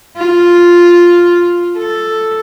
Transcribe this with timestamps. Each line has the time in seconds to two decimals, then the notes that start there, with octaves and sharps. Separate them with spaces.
0.17 F4
1.78 A4